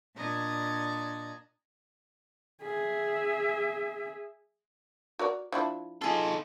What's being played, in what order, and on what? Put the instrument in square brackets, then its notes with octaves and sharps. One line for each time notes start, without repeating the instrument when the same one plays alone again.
[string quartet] A#2 D4 D#5 A#5 G#6
[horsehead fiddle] G#4 E5
[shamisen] F#4 A#4 D5
F3 D4 E4
[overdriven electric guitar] D#4 A4 [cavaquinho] F4 G#4